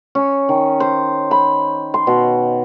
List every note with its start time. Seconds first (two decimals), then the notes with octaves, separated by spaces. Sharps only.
0.15 C#4
0.49 D#3
0.80 C5
1.31 B5
1.94 C6
2.07 B2